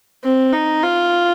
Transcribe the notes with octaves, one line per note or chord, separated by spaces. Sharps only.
C4
D#4
F4